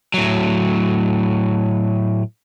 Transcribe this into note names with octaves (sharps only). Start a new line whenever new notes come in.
A2 F#3